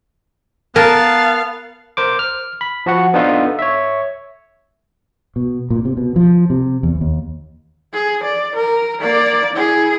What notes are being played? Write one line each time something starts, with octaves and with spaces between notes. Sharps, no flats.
B3 A#4 F5 G#5 A5
A#4 C5 D6
F6
B5
F3 F#4 F#5
B3 D4 D#4 F4 A4 F5
C#5 E5
B2
A#2
C3
B2
F3
C3
E2
D#2
G#4
D5
A#4
A#3 D5
E4 G#4